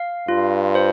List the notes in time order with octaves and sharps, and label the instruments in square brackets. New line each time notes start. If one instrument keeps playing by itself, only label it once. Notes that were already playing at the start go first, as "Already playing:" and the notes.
Already playing: [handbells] F5
[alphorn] G2 [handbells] F4
[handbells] C5